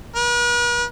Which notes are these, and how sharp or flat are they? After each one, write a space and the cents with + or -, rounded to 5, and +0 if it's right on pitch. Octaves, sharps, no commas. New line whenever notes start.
B4 -45